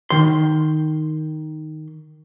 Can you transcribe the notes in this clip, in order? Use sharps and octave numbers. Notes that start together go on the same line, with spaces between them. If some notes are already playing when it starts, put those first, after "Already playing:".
D#3 C6